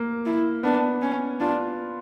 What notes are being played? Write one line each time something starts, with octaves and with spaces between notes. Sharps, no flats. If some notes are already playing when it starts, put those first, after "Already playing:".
Already playing: A#3
E4
B3 D4
C#4
D4 F4